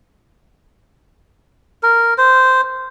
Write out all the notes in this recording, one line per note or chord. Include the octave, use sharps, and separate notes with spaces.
A#4
C5